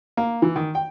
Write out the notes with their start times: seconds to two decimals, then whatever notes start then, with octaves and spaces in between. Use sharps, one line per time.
0.17 A#3
0.42 E3
0.56 D#3
0.75 G5